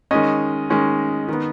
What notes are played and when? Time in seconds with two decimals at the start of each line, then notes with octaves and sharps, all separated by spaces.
0.11 D#3 G#3 C#4 D#5
0.70 D#3 G#3 C#4
1.29 D#3 B3